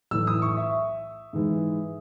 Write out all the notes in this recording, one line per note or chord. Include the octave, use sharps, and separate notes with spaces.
B1 A2 E3 E6
D#6
C#6
E5
G#2 E3 G#3